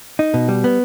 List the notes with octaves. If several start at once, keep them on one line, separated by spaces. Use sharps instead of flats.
D#4
B2
G3
B3